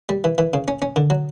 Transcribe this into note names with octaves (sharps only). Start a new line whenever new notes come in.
G3
E3
E3
C#3
C#4
C#4
D3
F#3